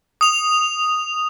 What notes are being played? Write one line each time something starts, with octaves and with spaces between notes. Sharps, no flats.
D#6 F7